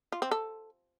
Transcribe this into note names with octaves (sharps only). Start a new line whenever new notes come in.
F4
C4
A4